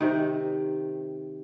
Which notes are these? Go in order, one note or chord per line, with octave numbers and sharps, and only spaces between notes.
C3 D#3